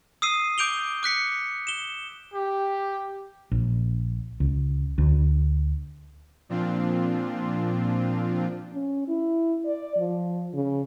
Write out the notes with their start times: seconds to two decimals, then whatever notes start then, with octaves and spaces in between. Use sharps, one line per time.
0.22 D#6 E6 C7 D#7
0.58 D6 G6 D7 F7 G7
1.03 D6 F#6 B6 C#7
1.67 E7 G7
2.35 G4
3.51 A#1
4.40 C#2
4.98 D2
6.49 A#2 F3 C4 D4 F4
8.73 C#4
9.08 E4
9.66 D5
9.97 F3
10.53 C#3